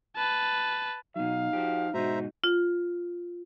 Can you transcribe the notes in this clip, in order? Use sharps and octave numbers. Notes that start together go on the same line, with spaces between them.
B4 A5
B2 F#3 D#4 F5
F3 F#4 G4
G#2 B2 D#4 F#4 C5 E5 A#5
F4